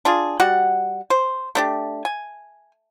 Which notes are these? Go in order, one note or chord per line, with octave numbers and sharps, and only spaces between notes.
D4 F4 G#4
G3 F#4 F#5
C5
A3 D4 G4
G#5